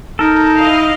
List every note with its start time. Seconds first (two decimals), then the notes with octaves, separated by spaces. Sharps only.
0.19 D#4 A4 A#4
0.58 E4 D#5 F5